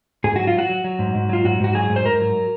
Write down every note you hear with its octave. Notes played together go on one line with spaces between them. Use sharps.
G#2 G#4
F#3 F#4
F4
F#3 F#4
F#3
F#3
G#2
G#2
F#3 F4
G#2 F#4
G#2 F#4
F#3 G#4
G#2
C5
G#2 A#4
F#3